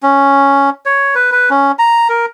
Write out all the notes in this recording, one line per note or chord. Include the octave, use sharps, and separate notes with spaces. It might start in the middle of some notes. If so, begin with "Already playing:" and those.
C#4
C#5
B4
B4
C#4
A#5
A#4